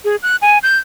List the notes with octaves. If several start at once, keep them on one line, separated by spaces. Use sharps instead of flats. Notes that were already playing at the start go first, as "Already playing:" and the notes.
G#4
F#6
G#5
G6